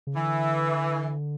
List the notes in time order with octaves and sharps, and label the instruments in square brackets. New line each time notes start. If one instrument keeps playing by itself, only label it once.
[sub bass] C#3
[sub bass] D3 [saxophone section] E3